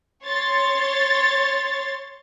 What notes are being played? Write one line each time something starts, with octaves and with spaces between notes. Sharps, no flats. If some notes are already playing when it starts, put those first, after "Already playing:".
C#5 C6 A6